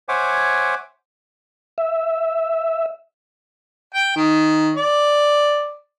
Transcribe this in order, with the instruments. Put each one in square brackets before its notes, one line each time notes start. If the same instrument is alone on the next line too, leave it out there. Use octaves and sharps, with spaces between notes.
[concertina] C5 C#5 E5 F#5 G#5 D6
[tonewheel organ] E5
[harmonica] G5
D#3
D5